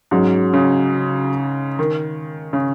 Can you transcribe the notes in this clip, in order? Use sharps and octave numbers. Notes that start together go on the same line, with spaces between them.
G#2 F#3 C#4 G#4
C#3
D#3
C#3